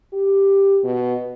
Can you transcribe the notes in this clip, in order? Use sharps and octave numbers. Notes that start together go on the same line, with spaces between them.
G4
B2